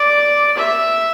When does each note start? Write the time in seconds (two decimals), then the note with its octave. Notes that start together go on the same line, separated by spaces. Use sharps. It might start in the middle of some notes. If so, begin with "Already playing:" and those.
Already playing: D5
0.57 E5